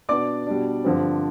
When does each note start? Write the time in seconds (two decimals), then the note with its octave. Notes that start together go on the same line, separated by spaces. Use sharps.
0.09 B2 B3 D4 D5 D6
0.47 B2 G3 D4
0.84 G2 D3 F3 C4